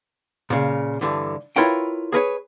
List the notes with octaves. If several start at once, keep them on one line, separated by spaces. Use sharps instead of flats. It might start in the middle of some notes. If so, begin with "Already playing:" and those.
A#2 C#3
G2 D3 E3
E4 F4 A#4 B4 C#5 G5
G#4 A#4 B4 C#5